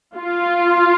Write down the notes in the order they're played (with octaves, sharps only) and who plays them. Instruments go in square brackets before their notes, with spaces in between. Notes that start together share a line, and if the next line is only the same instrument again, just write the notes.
[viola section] F4